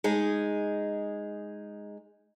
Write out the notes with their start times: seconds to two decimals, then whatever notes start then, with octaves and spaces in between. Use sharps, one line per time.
0.04 G#3 D#4 G#4